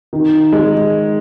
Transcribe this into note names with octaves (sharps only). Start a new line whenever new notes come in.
D#3
G#3